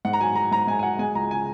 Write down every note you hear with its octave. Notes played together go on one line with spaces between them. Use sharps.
G#2 F#5
A#5
F#3 G#5
F#3 A#5
G#2 A#5
G#2 G#5
G#5
F#3 F#5
G#3 G#5
C#2 A#5
C#3 G#5